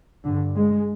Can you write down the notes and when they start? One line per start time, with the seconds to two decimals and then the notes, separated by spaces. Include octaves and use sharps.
0.24 G2 D3
0.55 G#3